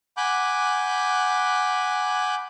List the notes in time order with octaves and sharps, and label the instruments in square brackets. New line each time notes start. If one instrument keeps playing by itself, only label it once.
[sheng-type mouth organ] F#5 G#5 B5 D6 F#6 G6